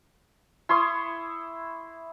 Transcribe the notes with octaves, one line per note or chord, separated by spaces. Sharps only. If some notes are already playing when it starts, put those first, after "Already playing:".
E4 C6 C#6 D#6